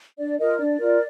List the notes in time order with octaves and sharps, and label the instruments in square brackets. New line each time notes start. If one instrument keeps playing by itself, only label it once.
[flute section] D4 D5
F4 A#4 D#5
D4 D5
F4 A#4